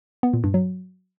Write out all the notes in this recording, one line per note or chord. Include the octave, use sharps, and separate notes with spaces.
B3
A#2
G2
F#3